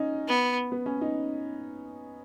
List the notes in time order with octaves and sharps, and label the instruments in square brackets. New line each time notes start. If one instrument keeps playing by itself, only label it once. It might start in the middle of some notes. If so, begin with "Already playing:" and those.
Already playing: [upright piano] C#4 D#4
[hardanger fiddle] B3
[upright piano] B3
C#4
D#4